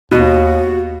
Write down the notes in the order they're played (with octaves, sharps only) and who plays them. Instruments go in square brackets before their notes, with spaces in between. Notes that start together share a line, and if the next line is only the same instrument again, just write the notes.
[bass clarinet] D#2 [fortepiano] B2 [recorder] F#4